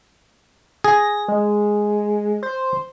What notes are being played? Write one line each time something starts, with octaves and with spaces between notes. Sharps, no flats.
G#4 A#6
G#3
C5